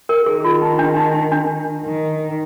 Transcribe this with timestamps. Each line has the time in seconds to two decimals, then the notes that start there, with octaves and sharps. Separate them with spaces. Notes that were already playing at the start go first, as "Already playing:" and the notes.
0.09 A#4
0.26 D#3 G#4
0.44 F4
0.62 D#4
0.79 D4
0.96 D#4
1.14 D#4
1.32 D4
1.84 D#3